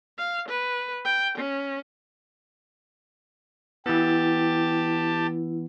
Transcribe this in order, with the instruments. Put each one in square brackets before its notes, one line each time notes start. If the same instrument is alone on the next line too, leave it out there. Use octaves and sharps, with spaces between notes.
[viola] F5
B4
G5
C#4
[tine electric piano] E3 B3 [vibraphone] E4 [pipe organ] G4 A5